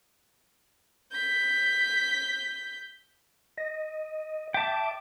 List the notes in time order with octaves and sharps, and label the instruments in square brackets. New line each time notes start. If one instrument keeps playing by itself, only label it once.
[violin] G6 B6
[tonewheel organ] D#5
[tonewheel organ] E5 D6 [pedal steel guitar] G5 A5